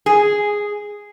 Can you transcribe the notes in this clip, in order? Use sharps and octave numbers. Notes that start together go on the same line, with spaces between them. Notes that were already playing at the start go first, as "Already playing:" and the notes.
G#4